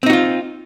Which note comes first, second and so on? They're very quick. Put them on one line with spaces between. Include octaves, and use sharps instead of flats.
C4 D#4 F#4 F4